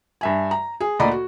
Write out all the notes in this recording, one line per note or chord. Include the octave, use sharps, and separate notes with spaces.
G2 E5 G#5
A#5
G#4
D2 A#2 D5 D#5 A#5 B5
F#4